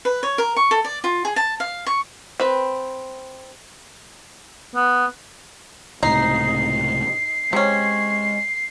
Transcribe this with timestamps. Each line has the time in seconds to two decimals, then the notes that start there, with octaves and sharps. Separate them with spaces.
0.05 B4
0.23 C#5
0.38 A#4
0.56 C#6
0.71 A4
0.85 D5
1.04 F4
1.25 G#4
1.36 A5
1.60 F5
1.87 C#6
2.40 C4 B4
4.75 B3
6.03 C#2 A2 C3 D#4 C7
7.53 C3 G#3 C#4